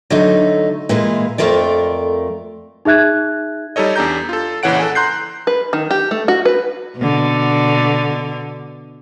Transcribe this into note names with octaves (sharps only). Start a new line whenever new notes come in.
D3 F#3 A3 D#4
A#2 E3 G#3 F4
F2 G#2 A3 F4 A#4 D5
D#4 G#4 E5 F#6 G#6
G3 D#4 A4 C#5 D#5
E2 D4 G4 A#5 G6
F4 A4
A#1 C#3 E3 C#5 F#5 D7
A4 F#5 G#5
A#5 C6 F#6 G6 C7
B4
D#3
G4
A3
F#4
B4
B2 D3